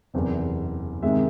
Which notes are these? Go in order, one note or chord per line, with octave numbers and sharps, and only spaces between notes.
F#1 E2 C3
C3 D#3 G#3 E5